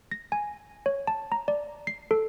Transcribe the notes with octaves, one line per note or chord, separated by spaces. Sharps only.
A#6
G#5
C#5
A5
A#5
D5
C7
A4